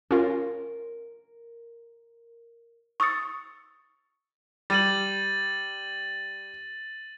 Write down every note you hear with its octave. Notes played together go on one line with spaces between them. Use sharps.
C#4 F4 A#4
C#6 D#6 E6 A6 C#7
G3 A6 D#7 F#7